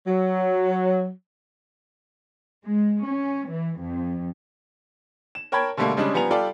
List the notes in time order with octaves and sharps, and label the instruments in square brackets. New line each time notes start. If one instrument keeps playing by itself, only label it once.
[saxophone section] F#3
[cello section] G#3
C#4
E3
F2
[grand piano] E7
A#4 C#5 G5 A5 B5 G#6
B2 D3 G3 A3 A#3
C#3 G3 G#3 C#4 D4
F3 G3 B3 G#5 A#5 F7
G3 F4 G4 A4 D5